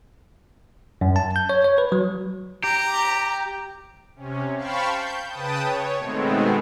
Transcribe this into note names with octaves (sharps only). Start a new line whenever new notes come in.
F#2
A5
G6
C#5
C#5
B4
F#3
G4 A#5
C3 C#4
C5 F5 G5 A5 B5 C#6
G6
C#3 B4 G5 A5 D#6
C#5
B2 D#3 G#3 A3 B3 C4